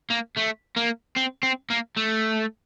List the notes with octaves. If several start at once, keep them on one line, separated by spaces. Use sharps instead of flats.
A#3
A3
A#3
C4
C4
A#3
A3